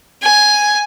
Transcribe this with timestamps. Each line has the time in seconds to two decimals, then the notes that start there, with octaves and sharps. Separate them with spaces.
0.22 G#5